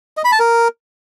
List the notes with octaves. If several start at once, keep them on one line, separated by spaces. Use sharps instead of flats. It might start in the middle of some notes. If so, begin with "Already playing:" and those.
D#5
B5
A5
A#4